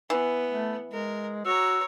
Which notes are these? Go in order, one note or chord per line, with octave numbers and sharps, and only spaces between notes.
E3 B3
A3
G#3 A#4
F#4 C#5 A#5 E6